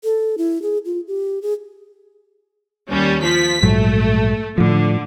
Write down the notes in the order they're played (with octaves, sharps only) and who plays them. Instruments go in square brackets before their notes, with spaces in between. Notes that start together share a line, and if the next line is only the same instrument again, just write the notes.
[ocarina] A4
E4
G#4
F4
G4
G#4
[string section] D#2 G3 C#4
F3 B6
[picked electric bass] A#1 G#2 F#3 [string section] A3
[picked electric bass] A2 F3 [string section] D3